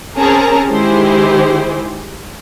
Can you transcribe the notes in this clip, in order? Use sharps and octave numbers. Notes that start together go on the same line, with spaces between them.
C4 C#4 G#4 A#4 A5 A#5
D#3 G#3 E4 G4 G#4 C5